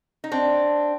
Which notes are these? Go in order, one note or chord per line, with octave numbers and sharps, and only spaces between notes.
D#4
C4 D4